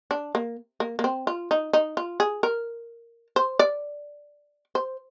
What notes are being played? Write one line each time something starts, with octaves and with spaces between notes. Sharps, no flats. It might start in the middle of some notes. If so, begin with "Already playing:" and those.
D4
A#3
A#3
A#3
C4
F4
D#4
D#4
F4
G#4
A#4
C5
D5
C5